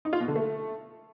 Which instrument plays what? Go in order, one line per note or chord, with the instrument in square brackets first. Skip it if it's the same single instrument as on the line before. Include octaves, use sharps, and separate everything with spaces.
[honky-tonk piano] D#4
F4
B2
D3
A3